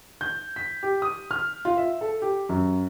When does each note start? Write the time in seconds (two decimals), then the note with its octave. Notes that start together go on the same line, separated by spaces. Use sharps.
0.21 G6
0.56 B6
0.83 G4
1.02 D#6
1.31 F6
1.65 F4
1.77 E5
2.01 A4
2.22 G4
2.49 F#2